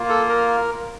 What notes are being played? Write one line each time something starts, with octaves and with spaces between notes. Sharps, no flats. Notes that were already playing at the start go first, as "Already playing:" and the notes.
Already playing: A#3 F4
A4
A#4